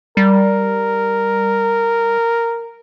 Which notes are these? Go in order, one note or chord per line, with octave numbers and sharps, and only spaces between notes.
G3 A#4